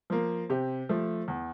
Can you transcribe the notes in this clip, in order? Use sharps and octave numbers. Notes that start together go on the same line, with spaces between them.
F3 A#3
C3 G4
F3 A3
E2